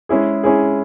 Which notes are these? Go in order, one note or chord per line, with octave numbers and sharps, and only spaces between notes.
G#3 C#4 E4 G#4
G#3 C#4 E4 G#4